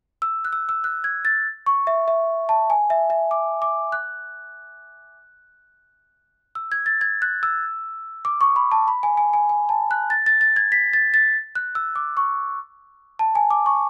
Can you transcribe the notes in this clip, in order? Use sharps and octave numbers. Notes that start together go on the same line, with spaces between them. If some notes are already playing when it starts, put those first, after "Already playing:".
E6
F#6
E6
E6
F#6
G#6
A6
C#6
E5
E5
A5
G#5
E5
E5
D6
D6
F#6
E6
G#6
A6
G#6
F#6
E6
D6
C#6
B5
A5
B5
G#5
G#5
G#5
G#5
A5
F#6
A6
A6
A6
G#6
B6
A6
A6
F#6
E6
D6
C#6
A5
G#5
D6
C#6